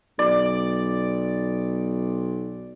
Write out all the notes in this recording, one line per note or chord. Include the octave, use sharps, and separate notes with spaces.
B1 D5